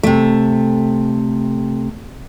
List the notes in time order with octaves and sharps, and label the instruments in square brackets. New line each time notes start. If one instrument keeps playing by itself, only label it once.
[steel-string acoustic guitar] C3 A3